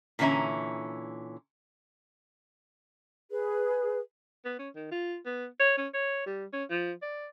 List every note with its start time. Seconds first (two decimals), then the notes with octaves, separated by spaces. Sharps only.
0.19 A#2 D3 E3 C#4 E5 A#5
3.31 G#4 B4
4.45 B3
4.59 C#4
4.76 D#3
4.91 F4
5.26 B3
5.60 C#5
5.77 C#4
5.94 C#5
6.26 G3
6.53 C#4
6.70 F3
7.02 D5